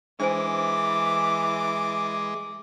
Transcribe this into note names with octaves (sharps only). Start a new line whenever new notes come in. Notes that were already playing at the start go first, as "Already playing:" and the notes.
E3 G#3 D4 C5 G#5 D6